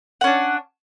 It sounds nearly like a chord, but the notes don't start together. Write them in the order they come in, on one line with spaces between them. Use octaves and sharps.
F#5 C#4 D4